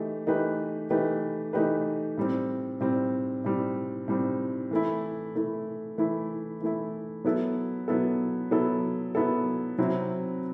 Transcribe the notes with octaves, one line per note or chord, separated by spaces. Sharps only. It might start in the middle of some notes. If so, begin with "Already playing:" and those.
Already playing: E3 A3 D#4 G4
E3 A3 D#4 G4 B4
E3 A3 D#4 G4 B4
E3 A3 D#4 G4 B4
A2 G3 C4
A2 G3 C4
A2 G3 C4
A2 G3 C4
E3 A3 E4
E3 A3 E4
E3 A3 E4
E3 A3 E4
F#3 B3 E4 A4
F#3 B3 E4 A4
F#3 B3 E4 A4
F#3 B3 E4 A4
C3 F#3 C4 E4